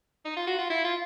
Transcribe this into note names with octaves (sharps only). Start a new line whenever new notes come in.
D#4
F4
F#4
F4
E4
F4